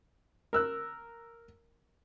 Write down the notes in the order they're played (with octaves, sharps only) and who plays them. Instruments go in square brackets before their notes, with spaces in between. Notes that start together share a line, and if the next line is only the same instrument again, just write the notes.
[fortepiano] A#4 E6 F#6